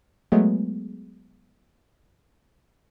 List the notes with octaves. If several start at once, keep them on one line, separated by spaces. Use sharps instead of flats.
F#3 G#3 A3 B3 G#4